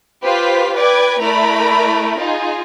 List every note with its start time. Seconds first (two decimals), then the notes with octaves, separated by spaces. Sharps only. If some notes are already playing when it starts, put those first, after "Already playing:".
0.23 F4 G4 B4 C5 F5 B6
0.76 B4 D5 G5 D6 G#6
1.20 A3 E4 A#4 D5 A#5 B5
2.19 D#4 F4 G#4